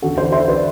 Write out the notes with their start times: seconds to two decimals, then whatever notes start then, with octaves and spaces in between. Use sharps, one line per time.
0.02 E2 D3 F#4 A4
0.18 A4 C5
0.33 C5 E5
0.48 B4 D5